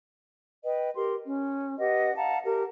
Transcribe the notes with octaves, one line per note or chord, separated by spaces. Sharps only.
B4 D#5 G5
G4 A#4 C6
C#4
G4 B4 D#5 F#5
F5 F#5 A5 A#5
G4 A#4